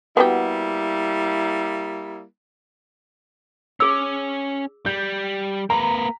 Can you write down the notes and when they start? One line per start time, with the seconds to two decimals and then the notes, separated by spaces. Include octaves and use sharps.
0.17 G3 A#3 B3 E4 F#4 G4
3.80 C#4 G#4 E6
4.86 G3 G6
5.70 A#3 B4 A#5